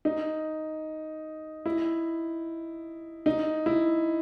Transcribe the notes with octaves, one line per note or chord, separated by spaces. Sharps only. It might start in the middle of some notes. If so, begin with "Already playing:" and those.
D#4
E4
D#4
E4